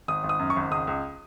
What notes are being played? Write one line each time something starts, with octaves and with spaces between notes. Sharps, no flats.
G#1 D#6
G#1
D#6
F#2
C#6
G#1
C#2 D#6
C#2